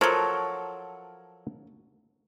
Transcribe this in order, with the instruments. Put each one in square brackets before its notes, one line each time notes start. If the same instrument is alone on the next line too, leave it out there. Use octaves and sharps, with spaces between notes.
[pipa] F3 F#3 [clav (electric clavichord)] A4 A#4 C#5